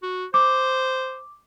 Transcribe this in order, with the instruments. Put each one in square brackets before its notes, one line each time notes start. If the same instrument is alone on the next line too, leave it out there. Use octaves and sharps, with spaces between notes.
[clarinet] F#4
[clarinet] C5 [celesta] D6